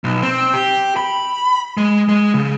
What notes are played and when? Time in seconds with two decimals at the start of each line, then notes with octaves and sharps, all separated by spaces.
0.04 B1
0.23 C4
0.54 G4
0.97 B5
1.77 G#3
2.09 G#3
2.34 C#3